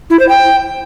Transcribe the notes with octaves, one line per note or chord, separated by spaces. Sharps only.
E4
C5
G5